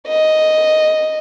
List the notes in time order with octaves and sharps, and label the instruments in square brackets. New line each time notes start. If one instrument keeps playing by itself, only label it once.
[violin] D#5